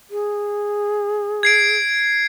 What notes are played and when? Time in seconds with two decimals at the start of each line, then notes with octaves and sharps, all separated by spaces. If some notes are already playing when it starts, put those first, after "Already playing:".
0.10 G#4
1.43 G#6 C7 D7